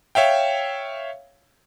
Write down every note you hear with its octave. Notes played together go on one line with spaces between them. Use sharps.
C#5 E5 F5 G5